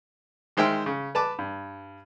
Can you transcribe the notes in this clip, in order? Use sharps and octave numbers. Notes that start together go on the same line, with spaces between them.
D#3 G#3 C5 E5 G5 F6
C#3
B4 A5 D6
G2